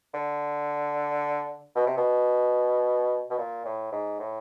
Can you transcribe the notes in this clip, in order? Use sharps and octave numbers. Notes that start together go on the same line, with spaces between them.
D3
B2
C3
B2
B2
A#2
A2
G#2
A2